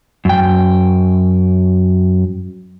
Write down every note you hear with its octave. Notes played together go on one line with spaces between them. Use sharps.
F#2 G5